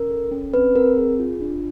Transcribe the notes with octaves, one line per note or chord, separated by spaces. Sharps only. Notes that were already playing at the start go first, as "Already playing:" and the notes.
Already playing: C#4 A#4
A4
C#4
C4 B4
C4 A#4
G#4
F4
D4